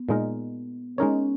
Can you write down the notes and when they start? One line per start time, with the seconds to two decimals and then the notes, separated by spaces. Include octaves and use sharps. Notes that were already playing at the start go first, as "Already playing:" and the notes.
Already playing: B3
0.09 A#2 G#3 D#4 A#4
0.98 G#3 C#4 D#4 A#4 C#5